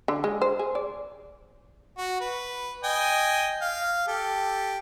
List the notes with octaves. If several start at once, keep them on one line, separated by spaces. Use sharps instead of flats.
D3
G#3
C5
G#4
D5
F#4
B4
D#5 G5 G#5
F5
G4 A4